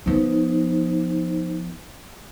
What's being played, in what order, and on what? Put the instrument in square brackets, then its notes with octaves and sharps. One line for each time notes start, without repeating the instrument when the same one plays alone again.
[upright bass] F3 B3 [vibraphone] D#4 C5